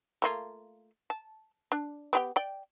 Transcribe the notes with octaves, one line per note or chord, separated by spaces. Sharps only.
A3 A#3 F4
A5
D4
B3 G4 G5
D5 G5